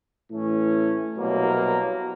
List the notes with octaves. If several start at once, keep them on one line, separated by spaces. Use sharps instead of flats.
A2 E3 A3 C#4
C2 B2 F#3 A#3